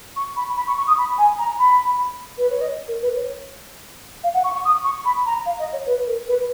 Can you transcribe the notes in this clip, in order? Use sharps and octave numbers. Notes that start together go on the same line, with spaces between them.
C#6
B5
B5
C#6
C#6
D#6
B5
G#5
A#5
B5
B4
C#5
D#5
A#4
B4
C#5
F5
F#5
C#6
C#6
D#6
C#6
B5
A#5
F5
D#5
C#5
B4
A#4
B4